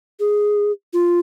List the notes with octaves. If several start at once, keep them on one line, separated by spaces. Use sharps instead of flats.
G#4
F4